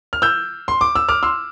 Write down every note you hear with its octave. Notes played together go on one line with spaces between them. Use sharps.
F6
E6 G6
C6
D6
E6
D6 F6
C6 E6